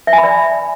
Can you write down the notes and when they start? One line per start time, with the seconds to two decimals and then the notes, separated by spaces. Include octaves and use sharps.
0.07 E5
0.13 G#5
0.18 B5
0.24 D5